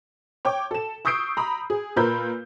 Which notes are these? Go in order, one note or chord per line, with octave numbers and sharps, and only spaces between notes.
C#5 G5 D6
A4 E7
C#6 D#6 E6 G6 C7 D7
A#5 B5 D#6
G#4
A#2 F4 A#4 B4 E6 G6